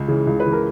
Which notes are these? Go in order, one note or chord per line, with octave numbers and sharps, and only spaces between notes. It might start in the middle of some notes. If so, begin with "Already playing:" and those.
Already playing: C#2
C#3 E3
C#2
B4
C#3 E3
A#4